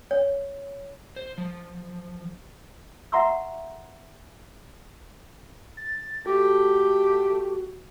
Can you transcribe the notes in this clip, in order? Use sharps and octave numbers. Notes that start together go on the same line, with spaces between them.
C#5
C5
F3
E5 F#5 A#5 C6 C#6 E6
A6
A3 F#4 G4